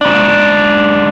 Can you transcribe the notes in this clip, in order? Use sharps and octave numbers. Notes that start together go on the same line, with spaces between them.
G#2 D4